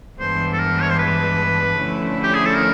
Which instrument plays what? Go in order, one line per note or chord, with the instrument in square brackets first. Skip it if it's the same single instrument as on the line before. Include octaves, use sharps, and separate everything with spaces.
[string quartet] G2 E3 G#3 B3 D4 [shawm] C5
[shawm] A4
A#4
C#5
C5
B4
[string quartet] D3 F3 A3 C#4 E4
[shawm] G4
G#4
A4
A#4